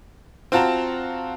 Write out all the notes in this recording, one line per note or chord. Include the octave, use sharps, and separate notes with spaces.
C4 F4 F#4 A5 A#5